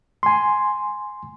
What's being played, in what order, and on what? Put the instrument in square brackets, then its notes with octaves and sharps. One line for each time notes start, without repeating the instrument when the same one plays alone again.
[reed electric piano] G#5 C6